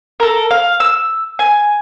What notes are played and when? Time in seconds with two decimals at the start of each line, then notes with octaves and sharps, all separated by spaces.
0.20 A4 A#4
0.51 F5
0.80 E6
1.39 G#5